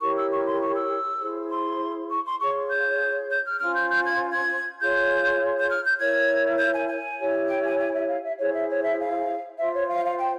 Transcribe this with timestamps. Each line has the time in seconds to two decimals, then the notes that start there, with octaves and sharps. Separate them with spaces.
0.01 E4 G4 A#4 C#5 C#6
0.15 E6
0.31 C#6
0.46 C6
0.61 C#6
0.75 E6
1.20 E4 G#4 C5
1.50 C6
2.10 C#6
2.25 C6
2.40 F4 G#4 C#5 C#6
2.70 G6
3.30 G6
3.45 F6
3.59 C#4 F4 C5 F6
3.74 G6
3.90 G6
4.04 G#6
4.31 G#6
4.79 F4 G#4 C#5 G6
5.59 G6
5.69 F6
5.84 G6
5.98 E4 A#4 C#5 G#6
6.58 G6
6.74 G#5
6.89 G#5
7.19 E4 G4 C#5
7.48 G5
7.64 G#5
7.78 G#5
7.93 E5
8.08 F5
8.23 E5
8.38 E4 G#4 C5 C#5
8.53 E5
8.68 C#5
8.83 E5
8.98 F5
9.58 F4 C5 E5
9.73 C#5
9.88 F5
10.03 F5
10.18 G5